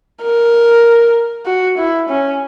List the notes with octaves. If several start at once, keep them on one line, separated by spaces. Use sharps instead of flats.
A#4
F#4
E4
C#4